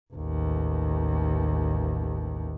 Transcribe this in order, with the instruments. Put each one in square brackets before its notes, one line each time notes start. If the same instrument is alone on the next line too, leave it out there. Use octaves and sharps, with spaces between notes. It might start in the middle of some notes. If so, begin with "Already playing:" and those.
[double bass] A1 D#2